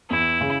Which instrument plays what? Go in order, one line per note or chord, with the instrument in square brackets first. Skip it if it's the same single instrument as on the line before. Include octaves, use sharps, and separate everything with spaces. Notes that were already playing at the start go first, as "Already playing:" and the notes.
[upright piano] E2 [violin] E4
[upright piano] C#3